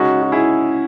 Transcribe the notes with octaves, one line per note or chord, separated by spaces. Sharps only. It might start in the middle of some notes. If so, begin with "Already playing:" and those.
Already playing: C#3 G#3 C#4 D#4 F#4
F#4
E4 G#4